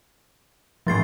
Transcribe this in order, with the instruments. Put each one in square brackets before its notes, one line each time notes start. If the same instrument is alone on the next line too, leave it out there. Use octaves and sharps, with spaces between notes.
[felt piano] A1 G#3 C6 [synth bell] F3 A6 C7